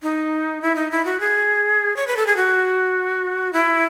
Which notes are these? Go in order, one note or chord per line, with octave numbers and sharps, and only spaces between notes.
D#4
E4
D#4
E4
F#4
G#4
C#5
B4
A4
G#4
F#4
E4